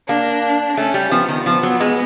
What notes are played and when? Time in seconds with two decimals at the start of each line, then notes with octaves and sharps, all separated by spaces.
0.08 A#3 D4
0.77 A3 C#4
0.94 G3
1.11 F3 B3
1.29 D#3
1.46 F3
1.63 F#3
1.80 G#3